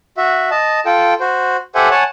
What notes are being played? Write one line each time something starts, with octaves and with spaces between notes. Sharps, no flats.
F#4 E5
D#5 A5
F4 A4 G5
F#4 C5
G4 A4 C5 E5 F#5 G#5
C#5 F#5 G#5 A5